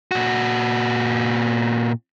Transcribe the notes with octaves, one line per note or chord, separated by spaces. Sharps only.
A#2 F#4